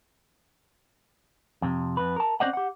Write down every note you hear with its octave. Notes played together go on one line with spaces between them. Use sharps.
F2 C3
F2 B4
A#4 A5
C4 C#4 C5 D5 D#5 F#5
G4 F#5